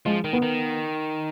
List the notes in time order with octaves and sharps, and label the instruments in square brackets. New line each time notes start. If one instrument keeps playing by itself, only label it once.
[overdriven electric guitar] F3 [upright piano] G#3
[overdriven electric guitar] D#3
[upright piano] B3
[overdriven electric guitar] D#3